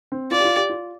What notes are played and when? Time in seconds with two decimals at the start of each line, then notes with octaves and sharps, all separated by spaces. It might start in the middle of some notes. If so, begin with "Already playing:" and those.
0.12 C4
0.31 F4 D5
0.40 G4
0.44 F4
0.56 G4
0.69 F4